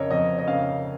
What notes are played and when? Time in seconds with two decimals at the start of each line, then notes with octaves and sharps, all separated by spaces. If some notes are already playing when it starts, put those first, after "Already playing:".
Already playing: F2 C#3 A#4 C#5 D#5
0.11 F2 D#5
0.39 D#5
0.48 C#3 F5